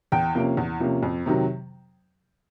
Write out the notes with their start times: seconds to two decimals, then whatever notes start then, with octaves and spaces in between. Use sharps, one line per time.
0.12 E2 G5
0.35 C3 F3 A#3 C#4
0.57 E2
0.80 C3 F3 A#3 C#4
1.03 F2
1.26 C3 D#3 F#3